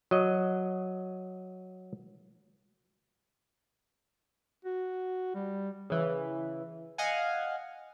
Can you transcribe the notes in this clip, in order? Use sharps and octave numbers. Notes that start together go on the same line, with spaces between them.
F#3 D#5
F#4
G3
C#3 E3
D#5 F5 F#5 G#5